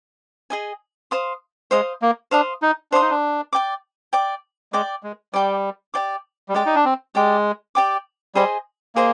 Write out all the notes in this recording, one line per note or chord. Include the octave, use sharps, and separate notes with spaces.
G#4 D#5 G#5
C5 F5 C6 D#6
G#3 C5 F5 C6 D#6
A#3
D4 C5 F5 C6 D#6
D#4
D4 C5 F5 C6 D#6
D#4
D4
D5 G5 D6
D5 G5 D6
G#3 D5 G5 D6
G#3
G3 D5 G5 D6
G4 D5 G5 D6
G3
G#3 G4 D5 G5 D6
D#4
D4
C4
G#3 G4 D5 G5 D6
G4 D5 G5 D6
G3 G#4 C5 D#5 G#5
A#3 G#4 C5 D#5